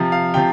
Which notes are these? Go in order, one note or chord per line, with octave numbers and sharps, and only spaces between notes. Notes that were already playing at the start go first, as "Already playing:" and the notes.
Already playing: C3 F3
F5
C3 F3 G5